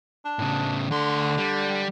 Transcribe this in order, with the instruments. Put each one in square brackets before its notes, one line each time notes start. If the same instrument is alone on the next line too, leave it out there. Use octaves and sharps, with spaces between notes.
[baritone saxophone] D4
[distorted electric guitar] A2 C#3
[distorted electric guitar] D2 C6 [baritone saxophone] D3
[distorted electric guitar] G3